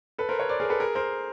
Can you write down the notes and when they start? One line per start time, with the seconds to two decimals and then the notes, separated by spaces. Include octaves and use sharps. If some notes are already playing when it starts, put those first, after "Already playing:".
0.18 A4 B4
0.29 A#4 C5
0.39 B4 C#5
0.49 C5 D5
0.60 G#4 A#4
0.70 A4 B4
0.80 G#4 A#4
0.95 A#4 C5